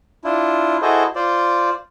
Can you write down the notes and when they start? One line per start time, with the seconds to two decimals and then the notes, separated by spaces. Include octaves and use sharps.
0.24 D4 E4 F4
0.82 E4 F#4 G#4 A4 C5 D#5
1.15 F4 C5 D5